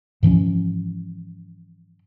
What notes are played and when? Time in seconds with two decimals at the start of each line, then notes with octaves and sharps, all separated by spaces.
0.23 G#2 E3 F3 C#4